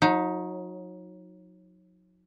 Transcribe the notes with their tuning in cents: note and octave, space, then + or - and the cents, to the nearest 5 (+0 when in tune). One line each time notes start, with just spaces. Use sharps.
F#3 -35 D#4 +15